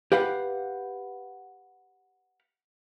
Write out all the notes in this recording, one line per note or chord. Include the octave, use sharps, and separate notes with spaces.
G4 B4 F5 F#5